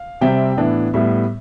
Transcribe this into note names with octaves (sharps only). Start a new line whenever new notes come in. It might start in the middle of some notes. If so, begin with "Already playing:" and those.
Already playing: F5
C3 G3 C4 E5 G5
A2 E3 B3 D4
A2 G3 B3 E5